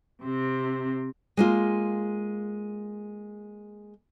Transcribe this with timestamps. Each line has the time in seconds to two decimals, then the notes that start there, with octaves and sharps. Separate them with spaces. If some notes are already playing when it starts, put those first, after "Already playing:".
0.23 C3 C4
1.37 G#3 A#3 F4